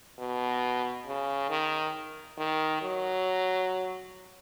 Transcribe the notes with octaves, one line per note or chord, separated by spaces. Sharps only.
B2
C#3
D#3
D#3
F#3